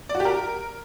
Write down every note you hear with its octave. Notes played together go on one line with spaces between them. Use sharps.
D5
F#4
G4
A#4